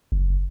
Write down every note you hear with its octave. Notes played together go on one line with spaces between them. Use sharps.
F#1